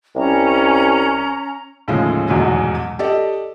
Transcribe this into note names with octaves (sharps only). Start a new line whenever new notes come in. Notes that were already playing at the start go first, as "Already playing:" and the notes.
C2 C#4 A#5
D#2 A2 C#3 F3 G#3
D#1 B1 E2 G#2 F#3 G#3
G4 A4 D5 D#5